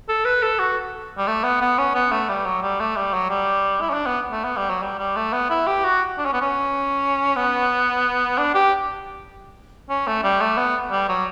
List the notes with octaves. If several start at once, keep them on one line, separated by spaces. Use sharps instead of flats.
A4
B4
A4
F#4
G3
A3
B3
B3
C#4
B3
A3
G3
F#3
G3
A3
G3
F#3
G3
E4
C#4
D4
B3
A3
B3
G3
F#3
G3
G3
A3
B3
E4
G4
F#4
D4
C#4
B3
C#4
B3
D4
G4
C#4
A3
G3
A3
B3
G3
F#3